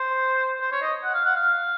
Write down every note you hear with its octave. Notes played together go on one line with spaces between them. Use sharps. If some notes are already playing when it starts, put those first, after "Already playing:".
Already playing: C5
C5
C#5
D#5
F#5
F5
F#5
F5